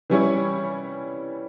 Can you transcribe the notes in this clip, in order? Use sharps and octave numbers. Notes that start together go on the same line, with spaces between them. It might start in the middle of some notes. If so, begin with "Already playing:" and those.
E3 G3 C#4 E4